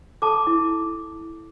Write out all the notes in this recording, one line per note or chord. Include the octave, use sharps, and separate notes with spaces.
A4 A5 D6
E4